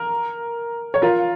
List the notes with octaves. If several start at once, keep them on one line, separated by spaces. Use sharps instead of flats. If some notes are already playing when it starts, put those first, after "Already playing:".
Already playing: A#4
C#5
F4 A#4